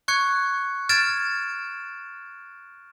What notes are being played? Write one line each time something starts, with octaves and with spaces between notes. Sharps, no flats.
C#6 F#6 G#6 C#7
F6 G#6 A6 D7 E7